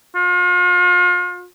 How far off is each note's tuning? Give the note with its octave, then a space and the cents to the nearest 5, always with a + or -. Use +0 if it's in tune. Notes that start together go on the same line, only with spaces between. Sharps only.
F4 +40